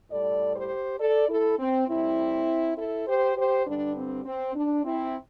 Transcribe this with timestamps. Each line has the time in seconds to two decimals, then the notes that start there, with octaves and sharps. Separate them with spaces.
0.10 A2 G3 A4 D5
0.55 G4 C5
1.00 A4 D5
1.29 E4 A4
1.59 C4
1.89 A2 G3 C4 E4
2.77 E4 A4
3.07 G4 C5
3.37 G4 C5
3.67 G2 D3 G3 D4
3.95 C4
4.26 C4
4.55 D4
4.84 C4 E4